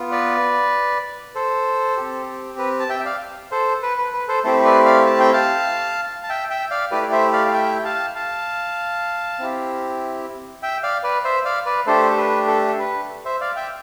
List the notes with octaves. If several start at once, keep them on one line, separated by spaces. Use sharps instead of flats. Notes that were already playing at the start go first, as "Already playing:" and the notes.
Already playing: B3 F4
B4 D5
A4 C5
C4 G4
B4
A5
E5 G5
E5
D5 F5
A4 C5
B4
B4
B4
A4 C5
A3 C4 E4 G4 A4 C5
B4 D5
D5 F5
A5
G5
F5 A5
A5
E5 G5
E5 G5
D5 F5
A3 E4 G4 B4 D5
D5
C5 E5
D5 F5
F5
E5 G5
G5
F5 A5
F5 A5
C4 E4 G4
E5 G5
D5 F5
B4 D5
C5 E5
D5 F5
B4 D5
A3 D4 G4 A4 C5
A4
B4
A4
A4
B4
C5 E5
D5 F5
E5 G5